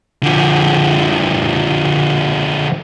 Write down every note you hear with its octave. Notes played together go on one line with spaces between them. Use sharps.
D3 F3